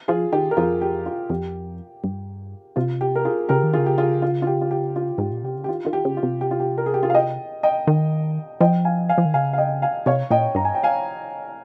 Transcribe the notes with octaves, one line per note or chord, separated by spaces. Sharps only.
F3 F4 G#4
D#3 G4
A#4
F2 F4 G#4
G4
F4
F2 G4
G2
C3 F4
G4
A#4
F4 G#4
C#3 G4 A#4
D#3
F4 G#4
C#3
G4
F4 G#4
F4
F4
G4
F4
G4
F4
G#2 G4
A#2
C3 G4
C#3
G4
D#3 F4
D#3 F4
G4
C#3
F4
C3
G4
F4
G4
A#4
G#4
G4
F4 G#4
F5
D#5 G5
D#5 G5
D#3
F3 D#5 G5
F5 G#5
F5 G#5
F3
D#3
C#3 F5 G#5
F5
D#5 G5
F5 G#5
C3 C#5 F5
A#2 D#5 G5
G2 A#5
G#5
G5
F5 G#5